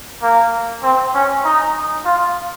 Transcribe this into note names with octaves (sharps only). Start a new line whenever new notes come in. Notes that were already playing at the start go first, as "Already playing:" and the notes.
A#3
C4
C#4
D#4
F4